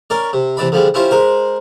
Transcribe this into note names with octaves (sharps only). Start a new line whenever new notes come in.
C#4 A#4 D5
C3
C3 E3 D5 B5
D3 F3 G3 G#3
C#4 E4 F4 G4 C5
G#3 A#4 C5